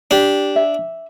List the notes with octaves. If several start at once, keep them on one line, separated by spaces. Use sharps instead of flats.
D4 G4
E5